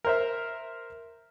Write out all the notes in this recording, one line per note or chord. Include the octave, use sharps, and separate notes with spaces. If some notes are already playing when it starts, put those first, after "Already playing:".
A#4 C5 E5